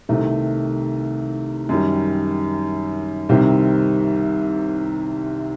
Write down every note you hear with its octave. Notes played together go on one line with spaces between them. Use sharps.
C2 C3 D#3 A3
F#2 D#3 G3
C2 C3 D#3 G3 C4